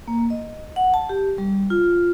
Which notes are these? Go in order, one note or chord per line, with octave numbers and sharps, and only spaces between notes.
A#3
D#5
F#5
A5
G4
G3
F4